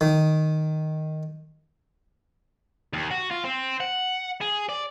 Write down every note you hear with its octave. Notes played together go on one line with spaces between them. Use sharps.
D#3
D#2
F#4
F4
C4
F#5
G#4
D5